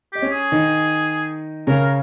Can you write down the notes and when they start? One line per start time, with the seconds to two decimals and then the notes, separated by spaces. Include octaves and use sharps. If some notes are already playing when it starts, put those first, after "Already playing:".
0.13 G4 D#5
0.22 C#4 C#5
0.32 G#4
0.52 D#3 D#4
1.67 C#3 C#4 A#4